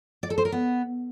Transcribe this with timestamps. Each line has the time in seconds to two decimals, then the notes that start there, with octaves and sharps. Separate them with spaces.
0.23 D5
0.30 A4
0.38 C5
0.45 A#4
0.52 B3